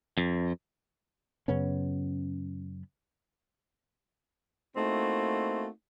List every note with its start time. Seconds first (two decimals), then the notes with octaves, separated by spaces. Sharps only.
0.18 F2
1.48 F#2 C#3 B3 C#4
4.76 A3 A#3 C4 D#4 E4 F#4